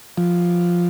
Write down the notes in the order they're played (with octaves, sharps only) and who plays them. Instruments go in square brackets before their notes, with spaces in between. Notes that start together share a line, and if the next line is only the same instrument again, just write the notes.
[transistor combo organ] F3